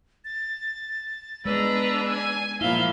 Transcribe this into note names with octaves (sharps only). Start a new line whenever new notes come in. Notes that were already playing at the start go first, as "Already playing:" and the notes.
A6
G#3 B3 D4 B4 A#5 E6
G#5
A#2 F3 E4 E5 F5 G7